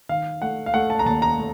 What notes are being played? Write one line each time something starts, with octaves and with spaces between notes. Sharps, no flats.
D#3 F5
A3 F#5
F5
A3 F#5
A5
A#5
D#2 A5
A#5
A3